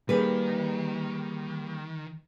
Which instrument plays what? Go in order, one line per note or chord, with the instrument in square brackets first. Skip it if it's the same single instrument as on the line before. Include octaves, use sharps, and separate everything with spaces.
[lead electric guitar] D#3 [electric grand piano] G3 A#3 [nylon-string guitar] G#4 B4